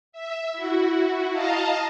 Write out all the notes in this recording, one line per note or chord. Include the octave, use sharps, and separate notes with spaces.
E5
E4 F#4
D#5 F5 A5 A#5